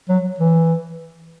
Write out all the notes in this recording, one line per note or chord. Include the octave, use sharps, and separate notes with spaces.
F#3
E3